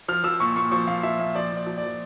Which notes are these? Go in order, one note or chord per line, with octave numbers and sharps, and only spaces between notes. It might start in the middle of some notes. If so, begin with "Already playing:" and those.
F3 F6
F3 E6
A#2 C#6
A#2 C#6
F3 C#6
A#2 F5
F3 E5
A#2 E5
F3 D5
A#2
D5
F3
D5
F3